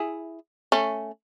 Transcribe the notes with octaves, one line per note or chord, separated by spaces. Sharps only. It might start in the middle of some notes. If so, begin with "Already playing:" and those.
Already playing: E4 G#4
A3 C#4